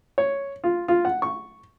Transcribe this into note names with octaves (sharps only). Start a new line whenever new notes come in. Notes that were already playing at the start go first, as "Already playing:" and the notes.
C#5
F4
F4
F#5
C#6